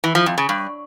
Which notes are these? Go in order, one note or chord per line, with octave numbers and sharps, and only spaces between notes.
E3
F3
F2
C#3
G2